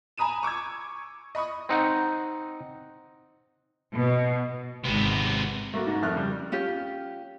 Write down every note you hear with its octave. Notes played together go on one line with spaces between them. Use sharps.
G#5 A#5 B5 D#6 D#7 E7
C#6 D6 E6 G#6
D#5 B5 C#6 D#6
C4 D#4 F#5
B2
G#1 C3 B3
A3 A#3 F#4
G#2
F2 A3 F6 F#6
C#3 G3
C#4 F4 G4